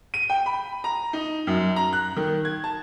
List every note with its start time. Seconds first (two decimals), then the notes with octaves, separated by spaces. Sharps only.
0.14 D#7
0.30 G5
0.46 B5
0.84 A#5
1.13 D#4
1.47 F#2
1.76 A#5
1.93 F#6
2.17 D#3
2.45 G#6
2.64 A5